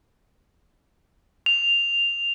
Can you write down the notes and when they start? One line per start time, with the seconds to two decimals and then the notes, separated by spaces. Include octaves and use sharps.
1.46 F7